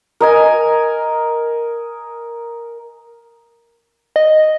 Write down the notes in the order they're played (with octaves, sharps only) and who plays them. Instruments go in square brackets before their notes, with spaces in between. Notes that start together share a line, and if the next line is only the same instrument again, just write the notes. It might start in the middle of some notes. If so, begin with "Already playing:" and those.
[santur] A#4 D#5 G#5
[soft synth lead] D#5